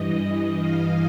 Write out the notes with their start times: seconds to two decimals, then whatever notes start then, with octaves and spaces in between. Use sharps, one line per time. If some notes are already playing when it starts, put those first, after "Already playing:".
Already playing: G2 E3 D#5
0.58 F5